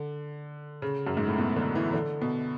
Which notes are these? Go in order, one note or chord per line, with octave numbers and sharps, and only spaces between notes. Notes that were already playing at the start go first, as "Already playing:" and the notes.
Already playing: D3
C#3
F#2
G#2
A2
B2
D3
E3
D3
B2